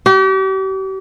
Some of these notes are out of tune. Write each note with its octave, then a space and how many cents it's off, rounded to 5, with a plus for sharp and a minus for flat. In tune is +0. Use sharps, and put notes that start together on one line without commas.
G4 -40